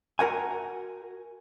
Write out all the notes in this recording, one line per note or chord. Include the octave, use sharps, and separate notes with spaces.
F#4 A#4 F#5 G#5